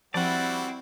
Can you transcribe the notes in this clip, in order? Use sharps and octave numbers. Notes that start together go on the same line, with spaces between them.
F3 G3 C4 E4 F#4 D5 F#5